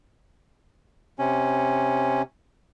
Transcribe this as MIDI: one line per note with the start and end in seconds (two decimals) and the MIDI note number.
1.19 2.22 48
1.19 2.22 61